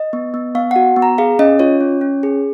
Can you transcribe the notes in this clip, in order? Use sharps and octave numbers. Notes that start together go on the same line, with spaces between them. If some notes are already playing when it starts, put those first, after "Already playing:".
Already playing: D#5
B3
B3
B3 F5
F#4 F#5
B3
A#5
G#4 F5
C#4 D#5
F4 C#5
C#4
C#4
G#4